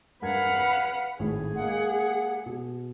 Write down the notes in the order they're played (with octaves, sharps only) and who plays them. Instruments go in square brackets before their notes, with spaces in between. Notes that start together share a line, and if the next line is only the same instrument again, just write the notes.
[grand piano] G2 A#4 G#6 [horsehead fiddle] B4 F5 [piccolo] F#5
[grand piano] B5
[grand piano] G#1 A2 [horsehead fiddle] G#4
[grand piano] G#3 A#3 [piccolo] F#5
[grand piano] B2